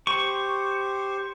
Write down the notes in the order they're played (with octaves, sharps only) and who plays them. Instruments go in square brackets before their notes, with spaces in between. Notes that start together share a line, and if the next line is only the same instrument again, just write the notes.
[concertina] G4 C5 [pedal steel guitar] C#6